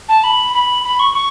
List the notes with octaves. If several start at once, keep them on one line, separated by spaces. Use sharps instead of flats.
A5
B5
B5
B5
C#6
C#6